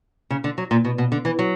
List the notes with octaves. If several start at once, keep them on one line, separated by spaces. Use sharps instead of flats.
C#3
D3
F#3
A#2
B2
B2
D3
E3
F#3